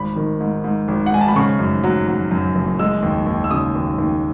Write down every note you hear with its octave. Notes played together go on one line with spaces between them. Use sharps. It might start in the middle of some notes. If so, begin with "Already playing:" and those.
Already playing: G#1 B5
D#3
G#2
G#2
G#1
F#5
G#2 G#5
A5
B5
C#3 C#6
F#2
F#3
F#3
F#2
F#1
G#3 E6
D#2
D#2
E6
C#3 D#6
D#2
D#2